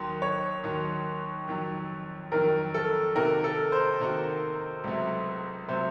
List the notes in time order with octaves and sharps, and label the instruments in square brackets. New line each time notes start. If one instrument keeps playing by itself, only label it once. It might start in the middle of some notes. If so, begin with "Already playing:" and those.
Already playing: [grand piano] D#2 D#3 F#3 [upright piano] C6
[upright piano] C#5
[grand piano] D#2 D#3 F#3
F2 D#3 F#3
[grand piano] F2 D#3 F#3 [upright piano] A#4
[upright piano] A4
[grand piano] C3 D#3 A#3 D#4 F#4 [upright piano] A#4
[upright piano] A4
C5
[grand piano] C3 D#3 A#3 D#4 F#4
C#2 C3 F#3 A3
[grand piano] C3 F#3 A3 [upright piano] C5